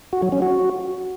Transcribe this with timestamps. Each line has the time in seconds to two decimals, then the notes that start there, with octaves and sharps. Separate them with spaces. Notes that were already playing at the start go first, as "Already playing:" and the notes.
0.13 F#4
0.22 F#3
0.32 C#4
0.42 F#4